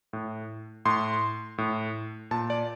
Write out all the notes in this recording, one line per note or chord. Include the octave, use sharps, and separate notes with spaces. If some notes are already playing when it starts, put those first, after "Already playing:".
A2
A2 C6
A2
A#2 A5
D5